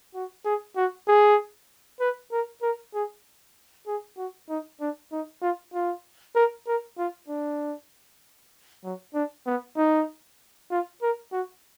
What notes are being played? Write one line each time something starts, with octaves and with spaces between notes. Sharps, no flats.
F#4
G#4
F#4
G#4
B4
A#4
A#4
G#4
G#4
F#4
D#4
D4
D#4
F4
F4
A#4
A#4
F4
D4
F#3
D4
B3
D#4
F4
A#4
F#4